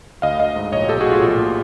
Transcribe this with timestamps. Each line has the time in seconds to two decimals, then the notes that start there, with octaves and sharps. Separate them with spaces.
0.22 D2 D#5 F5
0.39 D2 D#5 F5
0.56 G#2
0.72 A#1 C#5 D#5
0.89 B1 G4 A4
1.00 F#4 G#4
1.06 A2
1.11 F4 G4
1.22 A#1
1.39 A#2